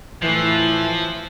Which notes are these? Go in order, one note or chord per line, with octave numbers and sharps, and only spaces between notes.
A2 E3 F3